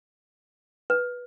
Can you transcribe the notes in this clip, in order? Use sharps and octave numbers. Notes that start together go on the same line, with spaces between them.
B4